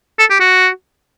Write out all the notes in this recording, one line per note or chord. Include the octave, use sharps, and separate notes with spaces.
A4
G4
F#4